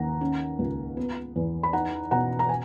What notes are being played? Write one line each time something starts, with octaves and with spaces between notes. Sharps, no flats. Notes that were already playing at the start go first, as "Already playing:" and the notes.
Already playing: D#2 F#5 A#5
C#4
C#2
B3
E2
B5
D#4 F#5 A#5
B2 F#5 A#5
A#5
G#5